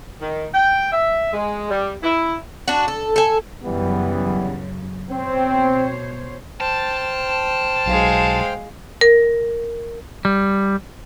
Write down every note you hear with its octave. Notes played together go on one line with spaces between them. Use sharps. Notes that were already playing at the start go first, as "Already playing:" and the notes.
D#3
G5
E5
G#3
G3
E4
D4 F#4
A4
A4 G#5
F#2 C#3 E3 F#3 G3 B3
B2 C4 C5 C#5
C5 G5 A5 F6
B1 G#3 F5
A#4
G3